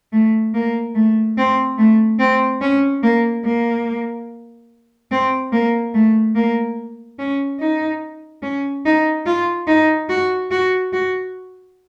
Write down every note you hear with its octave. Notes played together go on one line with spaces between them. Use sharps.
A3
A#3
A3
C4
A3
C4
C#4
A#3
A#3
C4
A#3
A3
A#3
C#4
D#4
C#4
D#4
F4
D#4
F#4
F#4
F#4